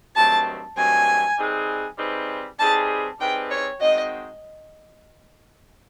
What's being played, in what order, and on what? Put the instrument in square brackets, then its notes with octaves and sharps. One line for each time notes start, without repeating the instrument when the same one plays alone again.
[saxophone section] G2 D#3 F#3 A3 C4 [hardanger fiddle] A5
[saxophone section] G2 D#3 F#3 A3 C4 [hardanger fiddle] G#5
[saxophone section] G3 C4 D#4 G#4 B4
G3 C4 D#4 G#4 B4
[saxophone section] G3 C4 D#4 G#4 B4 [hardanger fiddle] A5
[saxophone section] G3 C4 D#4 G#4 B4 [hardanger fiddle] G5
[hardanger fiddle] C#5
[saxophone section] D#3 G#3 C4 D#4 F#4 [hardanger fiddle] D#5